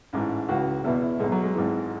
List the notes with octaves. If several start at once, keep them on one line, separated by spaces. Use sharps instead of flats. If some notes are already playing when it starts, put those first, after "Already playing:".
A1 G#2 E3
C#2 C#3 E3 F#4
E2 B2 E4
E4
B1 B2 G#3
F#3
G#3
G#1 G#2 E3